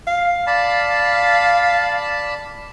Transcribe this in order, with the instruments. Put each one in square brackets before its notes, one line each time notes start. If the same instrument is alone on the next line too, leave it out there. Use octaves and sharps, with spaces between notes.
[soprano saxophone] F5
[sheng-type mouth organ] D5 A5 B5